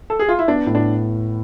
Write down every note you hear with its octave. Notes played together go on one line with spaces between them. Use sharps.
A4
G#4
F4
E4
B3 D4
A2
D4